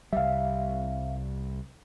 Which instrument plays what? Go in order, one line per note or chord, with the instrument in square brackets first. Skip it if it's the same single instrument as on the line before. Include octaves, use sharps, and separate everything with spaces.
[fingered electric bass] C2 G3 [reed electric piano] E5 F5